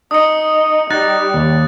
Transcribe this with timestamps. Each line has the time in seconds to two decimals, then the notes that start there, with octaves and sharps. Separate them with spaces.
0.11 D#4 D#6 C#7
0.91 G3 D#4 F#6 A6
1.34 D#2